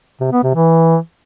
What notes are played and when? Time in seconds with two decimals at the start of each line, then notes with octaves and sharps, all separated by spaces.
0.21 C3
0.32 B3
0.43 C3
0.55 E3